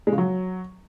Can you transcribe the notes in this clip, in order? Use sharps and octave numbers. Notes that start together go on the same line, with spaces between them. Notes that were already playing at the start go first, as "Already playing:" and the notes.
G#3
C#3
F#3